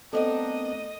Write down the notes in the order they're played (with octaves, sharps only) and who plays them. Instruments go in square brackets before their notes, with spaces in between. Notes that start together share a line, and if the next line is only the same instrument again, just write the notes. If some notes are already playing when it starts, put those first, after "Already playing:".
[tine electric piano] A3 B3 C4 [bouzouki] D4 D#4 A#4 [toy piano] A4 [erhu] D#5